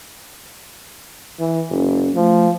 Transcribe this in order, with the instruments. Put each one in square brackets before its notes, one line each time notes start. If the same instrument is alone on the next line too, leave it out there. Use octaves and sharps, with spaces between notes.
[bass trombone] E3
[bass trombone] F#1 [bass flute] C#4
[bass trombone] F3 [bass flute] A3